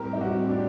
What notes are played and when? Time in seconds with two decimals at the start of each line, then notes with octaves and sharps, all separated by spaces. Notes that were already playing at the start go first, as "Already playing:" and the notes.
Already playing: A2 G3 C4 G4 A#4
0.13 D#4
0.21 F#4
0.49 D4